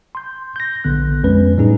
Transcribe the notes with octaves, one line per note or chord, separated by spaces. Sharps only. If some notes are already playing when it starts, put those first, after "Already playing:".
C6 G6
G6 A#6
A#1 D3 B3 F#6
F2 G#3 C#4 B4
A2 G3 C#4 D#4 G#4